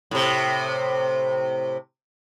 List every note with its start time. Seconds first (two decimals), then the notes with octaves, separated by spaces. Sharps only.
0.11 A2 C3